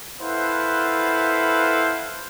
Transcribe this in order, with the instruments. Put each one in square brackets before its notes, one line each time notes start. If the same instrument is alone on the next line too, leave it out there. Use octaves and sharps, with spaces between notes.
[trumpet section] E4 A4 B4 C5 F5 F#5